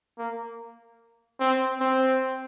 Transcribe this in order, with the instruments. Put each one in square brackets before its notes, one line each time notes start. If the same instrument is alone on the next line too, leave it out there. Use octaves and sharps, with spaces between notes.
[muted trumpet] A#3
C4
C4